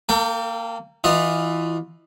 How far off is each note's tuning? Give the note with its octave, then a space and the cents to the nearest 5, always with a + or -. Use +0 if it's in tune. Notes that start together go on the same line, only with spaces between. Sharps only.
A#3 -15 A4 +40 G5 +0
E3 +0 F4 +25 D#5 -20